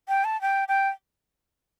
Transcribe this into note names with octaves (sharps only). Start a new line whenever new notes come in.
G5
A5
G5
G5